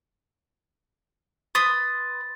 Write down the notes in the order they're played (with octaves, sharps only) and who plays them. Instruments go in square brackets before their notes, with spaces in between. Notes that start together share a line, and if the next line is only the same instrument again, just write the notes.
[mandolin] B4 C6 D#6 [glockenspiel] A6